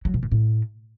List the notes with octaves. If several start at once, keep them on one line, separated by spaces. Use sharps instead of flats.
F#3
B2
A#2
A2